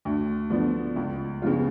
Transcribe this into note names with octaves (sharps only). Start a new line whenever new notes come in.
D2
D3 F3 B3
C#2
C#3 F3 B3 F4